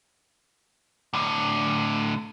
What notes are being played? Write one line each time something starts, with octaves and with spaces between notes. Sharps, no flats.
A2 D3